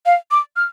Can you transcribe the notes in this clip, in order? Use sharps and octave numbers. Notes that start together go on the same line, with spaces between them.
F5
D6
F6